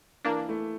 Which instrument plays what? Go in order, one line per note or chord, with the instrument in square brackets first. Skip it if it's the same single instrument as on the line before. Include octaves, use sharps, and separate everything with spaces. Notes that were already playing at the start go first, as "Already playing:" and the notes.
[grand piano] E3 [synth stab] A#3 D4
[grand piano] A3 E4